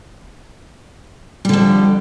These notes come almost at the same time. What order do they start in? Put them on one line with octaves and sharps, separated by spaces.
G3 D3 F2